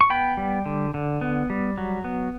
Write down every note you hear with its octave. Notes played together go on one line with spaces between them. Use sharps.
C#6
B3 G5 B5
G3
D3
D3
B3
G3
F#3
B3